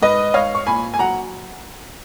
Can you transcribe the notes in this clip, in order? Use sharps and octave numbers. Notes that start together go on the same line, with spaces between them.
G#2 B4 D#5
G#2 C#5 F5
C#6
A#2 G#5 B5
G#5
F#3 F#5 A#5